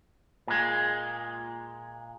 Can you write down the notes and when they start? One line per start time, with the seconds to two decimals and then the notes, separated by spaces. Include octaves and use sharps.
0.47 A#2 G#3